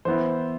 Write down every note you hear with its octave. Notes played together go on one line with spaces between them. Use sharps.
E3 B3 E4 C5